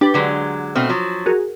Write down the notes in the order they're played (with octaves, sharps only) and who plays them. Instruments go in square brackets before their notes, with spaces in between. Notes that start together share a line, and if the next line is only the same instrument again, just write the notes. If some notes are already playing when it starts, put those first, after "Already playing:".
[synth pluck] D4 B4 [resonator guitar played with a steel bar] G4
[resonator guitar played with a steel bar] D3 F#3 G#3
[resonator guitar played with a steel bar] B2 A3 C4 [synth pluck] F6
[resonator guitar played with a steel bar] F3 F#3
[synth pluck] F#4 G#4 A#4